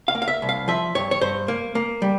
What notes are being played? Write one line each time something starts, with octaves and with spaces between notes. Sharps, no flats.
F5
A#3
F5
E5
C2
F5
F3 E5
G2 C#5
C#5
G2 C5
A#3
A#3
G3